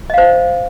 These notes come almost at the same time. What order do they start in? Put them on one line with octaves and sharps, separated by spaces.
D#5 F5 C5